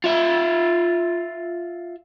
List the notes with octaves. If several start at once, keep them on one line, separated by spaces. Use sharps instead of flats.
F4 E5